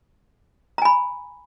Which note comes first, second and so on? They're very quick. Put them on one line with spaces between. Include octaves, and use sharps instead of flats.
A#5 G#5 B5